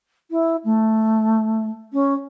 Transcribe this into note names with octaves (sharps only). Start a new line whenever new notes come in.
E4
A3
C#4